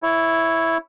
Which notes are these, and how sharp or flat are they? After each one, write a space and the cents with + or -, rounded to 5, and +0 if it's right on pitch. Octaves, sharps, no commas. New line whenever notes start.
E4 +0 C#5 +0